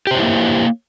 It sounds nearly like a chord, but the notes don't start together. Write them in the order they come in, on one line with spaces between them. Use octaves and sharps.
G4 C5 C#5 E4 A#3